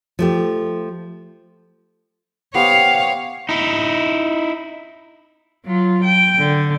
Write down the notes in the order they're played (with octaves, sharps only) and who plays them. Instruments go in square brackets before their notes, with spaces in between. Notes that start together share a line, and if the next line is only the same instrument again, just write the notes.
[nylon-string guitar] F3 A3 G4
[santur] B3 G4 C5 [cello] C#5 F5
[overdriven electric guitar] D#4 E4
[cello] F#3 F4
G5
D3